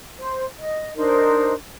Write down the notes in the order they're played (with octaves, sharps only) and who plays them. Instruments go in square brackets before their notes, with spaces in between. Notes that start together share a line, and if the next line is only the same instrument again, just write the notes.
[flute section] C5
D#5
D4 D#4 A#4 C5